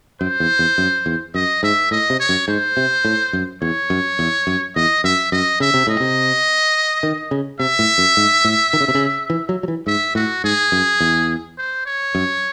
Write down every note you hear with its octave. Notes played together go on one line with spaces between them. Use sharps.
F#2 C5
E2
E2
F#2
E2
F#2 D#5
G#2 E5
A2 D#5
C3
C#5
F#2
G#2 C5
C3
A2
F#2
E2 C#5
F#2
E2
F#2
E2 D#5
F#2 E5
F#2 D#5
C#3 E5
C3
A2 D#5
C3
D#3
C#3
C3 E5
A2
F#2
G#2
A2
D#3
C#3
C3
C#3
E3
F#3
F#3
E3
G#2 E5
A2 F#4
G#2 G#4
F#2
E2
C5
C#5
F#2